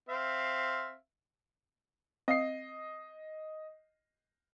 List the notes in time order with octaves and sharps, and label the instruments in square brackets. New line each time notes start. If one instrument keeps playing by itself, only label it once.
[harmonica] C4 E5 F5
[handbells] C4 F5 [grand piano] D#5 C7